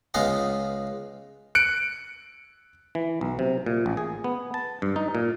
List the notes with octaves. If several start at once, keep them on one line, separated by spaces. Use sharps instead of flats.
C#2 G#3 B3 F4 D#5
F#6 C#7 D7
E3
B1
C3
A#2
A1
G#4
B3
A5
G2
D#4
A#2